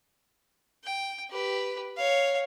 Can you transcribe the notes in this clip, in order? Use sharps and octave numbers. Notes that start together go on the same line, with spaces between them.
G5
G4 B4
C#5 F5